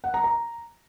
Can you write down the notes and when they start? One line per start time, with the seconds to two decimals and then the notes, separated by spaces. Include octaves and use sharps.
0.04 F#5
0.14 A#5
0.24 A#5